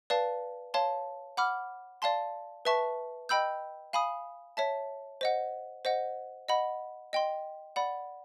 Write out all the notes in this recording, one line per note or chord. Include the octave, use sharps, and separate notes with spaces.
B4 D5 F5 A5
C#5 F5 A5 C6
F#5 B5 D6 F6
D5 F5 A5 C6
B4 E5 A5 C#6
D#5 G5 B5 E6 G6
F5 G#5 B5 D#6
C#5 E5 A5
C5 D#5 F#5
C5 D#5 F#5
D#5 F#5 B5
D#5 G5 C6
D5 F#5 B5